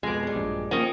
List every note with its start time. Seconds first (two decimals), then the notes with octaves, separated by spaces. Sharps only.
0.03 F2 B2 G#3 G#5 D6
0.23 F#3 G3
0.36 A#1 G2
0.71 D#3 F3 A#3 C#4 D#5 G5 C#6